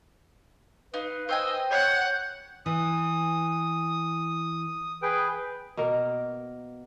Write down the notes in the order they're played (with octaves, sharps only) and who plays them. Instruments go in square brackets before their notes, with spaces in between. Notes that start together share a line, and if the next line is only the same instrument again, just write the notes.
[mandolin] D#4 [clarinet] B4 [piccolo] F5
[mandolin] C5 G5 G#5 [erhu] D#5 [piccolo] E6
[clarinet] C#5 [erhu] F#5 [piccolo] G6
[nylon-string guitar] E3 [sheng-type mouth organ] D#6
[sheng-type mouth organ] G#4 B4 G5
[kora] B2 A#3 A#4